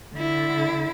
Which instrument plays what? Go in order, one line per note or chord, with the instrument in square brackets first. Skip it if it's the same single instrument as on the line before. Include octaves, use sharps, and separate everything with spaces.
[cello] D3 E4